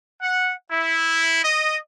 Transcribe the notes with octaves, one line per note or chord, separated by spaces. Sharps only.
F#5
E4
D#5